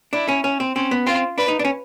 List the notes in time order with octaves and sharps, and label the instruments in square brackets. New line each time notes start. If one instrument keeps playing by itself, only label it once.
[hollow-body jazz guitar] D4 [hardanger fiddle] E4
[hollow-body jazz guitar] C#4
C#4
C4
[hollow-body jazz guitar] C4 [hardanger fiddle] C#4
[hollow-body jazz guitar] B3
[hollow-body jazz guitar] C4 [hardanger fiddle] F4
[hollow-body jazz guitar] D4 [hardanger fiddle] B4
[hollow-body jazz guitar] D#4
D4
C#4